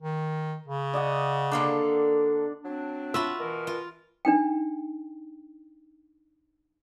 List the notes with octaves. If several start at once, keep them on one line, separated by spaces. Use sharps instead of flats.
D#3
C#3
D5 D#5 F#5
D3 A#3 D4 A4
F#3 C4 D4
F4 F#4 E5 B5
B2 E3 A#4
F4
D4 D#4 G5